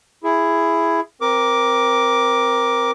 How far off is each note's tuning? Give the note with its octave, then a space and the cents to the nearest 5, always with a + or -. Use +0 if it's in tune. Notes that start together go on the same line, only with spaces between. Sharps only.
E4 +10 G#4 +0
C4 +0 A#4 +15 D6 +0